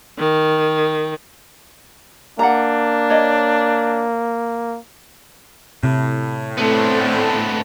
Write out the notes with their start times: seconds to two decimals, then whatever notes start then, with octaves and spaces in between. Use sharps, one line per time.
0.18 D#3
2.39 A#3 D4 F#5 A#5
3.10 C#5 D#5
5.84 A2 C3
6.57 A3 B3 C4 D4